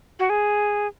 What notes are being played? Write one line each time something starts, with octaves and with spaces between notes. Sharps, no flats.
F#4
G#4